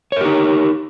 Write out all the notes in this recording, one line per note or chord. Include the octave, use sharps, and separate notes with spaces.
D#4 G4 A#4 C#5